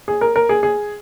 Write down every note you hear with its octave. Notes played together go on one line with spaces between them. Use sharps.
G#4
A#4
A#4
G#4
G#4